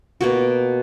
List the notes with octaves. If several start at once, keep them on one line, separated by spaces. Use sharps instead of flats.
B2 A#3 F#4